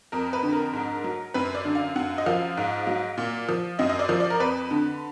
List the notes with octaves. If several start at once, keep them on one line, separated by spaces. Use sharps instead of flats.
F2 A#4
B4
D3
A#4
G#2
F#3
F#2 B4
D5
D3
F5
F#2 F#5
D#5
F3 F5
G#2
F#3
A#2
F3
F#2 D#5
D#5
D5
F3
D5
A#4
F2 B4
D3